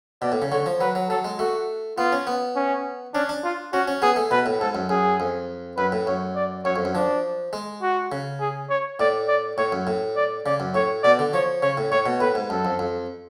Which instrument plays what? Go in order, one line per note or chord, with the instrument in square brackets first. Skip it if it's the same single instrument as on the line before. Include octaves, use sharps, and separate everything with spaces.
[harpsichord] B2 [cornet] D5
[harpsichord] A2
C#3
[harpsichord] D3 [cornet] C#5
[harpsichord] F3
[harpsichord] F#3 [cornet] B4
[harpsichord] F#3
[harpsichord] F#3 [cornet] A4
[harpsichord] G#3
[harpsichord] A3 [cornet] F#4
[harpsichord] B3 [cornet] F4
[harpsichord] C#4
B3
[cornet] C#4
[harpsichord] C#4 [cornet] D4
[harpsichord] D4
[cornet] F4
[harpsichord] C#4 [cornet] F#4
[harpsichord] C#4
[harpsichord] B3 [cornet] G#4
[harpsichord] A3
[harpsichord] B2 [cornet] B4
[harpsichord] A2
[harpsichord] G#2 [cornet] A4
[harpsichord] F#2
[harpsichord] F#2 [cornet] G#4
[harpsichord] F2
[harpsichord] F#2 [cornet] B4
[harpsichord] A2
[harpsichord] F#2 [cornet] C#5
[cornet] D5
[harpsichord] F#2 [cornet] C#5
[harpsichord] F2
F#2
[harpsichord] F3 [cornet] D4
[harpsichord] G#3
[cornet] F#4
[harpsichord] C#3
[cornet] G#4
C#5
[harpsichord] A2 [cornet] D5
[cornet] D5
[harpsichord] A2 [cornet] C#5
[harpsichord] F#2
A2
[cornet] D5
[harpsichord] C#3 [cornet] D5
[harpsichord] F#2
[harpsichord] A2 [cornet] C#5
[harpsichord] B2 [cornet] D5
[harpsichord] D3
[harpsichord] F3 [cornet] C#5
[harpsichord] C#3 [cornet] C#5
[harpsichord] A2
[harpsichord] A2 [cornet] C#5
[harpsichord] B2
[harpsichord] A2 [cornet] B4
[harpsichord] G#2
[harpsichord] F#2 [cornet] A4
[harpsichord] F2
F2